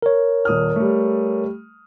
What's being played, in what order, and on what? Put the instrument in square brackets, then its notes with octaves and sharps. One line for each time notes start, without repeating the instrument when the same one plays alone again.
[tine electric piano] A#4 C#5
[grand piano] D#1 D#6 F6
G3 A3